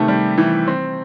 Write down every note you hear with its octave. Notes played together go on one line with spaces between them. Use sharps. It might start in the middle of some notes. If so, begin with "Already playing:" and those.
Already playing: C3 D#3 A3
G3
E3
C4